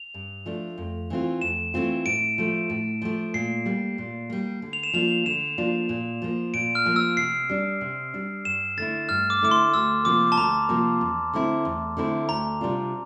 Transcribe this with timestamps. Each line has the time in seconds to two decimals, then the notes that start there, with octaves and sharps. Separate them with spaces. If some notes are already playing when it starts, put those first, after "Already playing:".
Already playing: F7
0.14 G2
0.46 F3 A3 D4
0.78 F2
1.10 E3 A3 C4 F4
1.41 F2 E7
1.74 E3 A3 C4 F4
2.06 A2 D7
2.38 F3 A3
2.70 A2
3.02 F3 A3
3.34 A#2 C7
3.66 G3 A#3
3.98 A#2
4.30 G3 A#3
4.62 D3
4.73 F7
4.83 E7
4.93 F3 A#3 D4 F4 F7
5.26 D3 E7
5.58 F3 A#3 D4 F4
5.89 A#2
6.22 F3 A#3
6.54 A#2 D7
6.75 F6
6.86 F3 A#3
6.96 E6
7.17 C3 C7
7.49 G3 D4
7.81 C3
8.14 G3 D4
8.45 G2 E7
8.77 D3 A3 E4 A6
9.09 G2 F6
9.30 D6
9.41 D3 A3 E4 D6
9.51 C6
9.74 D2 E6
10.05 C3 F3 A#3 D6
10.32 A5
10.38 D2 A#5
10.69 C3 F3 A#3
11.01 E2
11.33 D3 A3 C4 E4
11.65 E2
11.97 D3 A3 C4 E4
12.29 D2 A#5
12.61 C3 G3 D4 F4